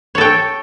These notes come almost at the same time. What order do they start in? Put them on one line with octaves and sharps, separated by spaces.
C#5 A4 G5